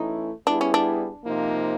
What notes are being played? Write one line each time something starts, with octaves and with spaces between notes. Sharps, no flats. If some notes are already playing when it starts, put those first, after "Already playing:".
Already playing: E3 A3 C#4 D#4 E4
G3 B3 D4 E4 G#4
C#4
D4
C3 F3 A#3 D#4